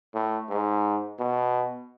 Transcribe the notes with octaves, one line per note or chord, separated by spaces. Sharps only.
A2
G#2
B2